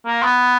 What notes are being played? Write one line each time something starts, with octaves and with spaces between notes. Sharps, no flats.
A#3
B3